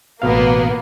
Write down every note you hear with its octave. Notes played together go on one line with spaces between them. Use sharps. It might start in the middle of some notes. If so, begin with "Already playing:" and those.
A1 B2 A#3 B3 F5